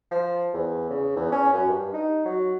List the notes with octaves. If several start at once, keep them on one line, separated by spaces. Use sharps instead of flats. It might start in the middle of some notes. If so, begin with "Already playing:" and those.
F3
E2
C#3
E2
C#4
F#2
G2
D#4
F#3